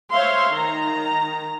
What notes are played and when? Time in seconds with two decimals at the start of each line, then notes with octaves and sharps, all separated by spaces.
0.13 C5 C#5 E5 F5 C6
0.52 D#3 A#5